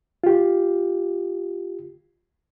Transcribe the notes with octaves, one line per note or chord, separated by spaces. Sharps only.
F4 G4